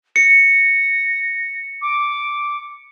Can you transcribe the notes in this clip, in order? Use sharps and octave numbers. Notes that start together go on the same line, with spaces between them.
A#6 C#7
D6